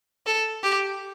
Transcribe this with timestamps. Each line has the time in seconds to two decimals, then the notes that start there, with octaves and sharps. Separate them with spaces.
0.26 A4
0.63 G4